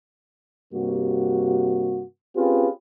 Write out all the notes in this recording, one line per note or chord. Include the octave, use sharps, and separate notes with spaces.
G2 C3 A#3 F#4
C4 C#4 F4 G4 G#4 B4